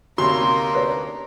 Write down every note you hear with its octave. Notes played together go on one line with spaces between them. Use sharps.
D2 C3 A#3 C#4 D#4 F#4 C#5 C6
B4 C#5 D5